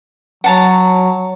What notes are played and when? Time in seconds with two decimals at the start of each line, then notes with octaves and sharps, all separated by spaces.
0.44 F#3 F#5 A5 A#5